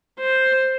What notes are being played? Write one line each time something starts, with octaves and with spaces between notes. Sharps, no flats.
C5